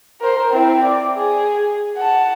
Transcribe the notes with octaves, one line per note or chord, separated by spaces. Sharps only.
A#4 C5
C4 E4
D5
G#4
F#5 A5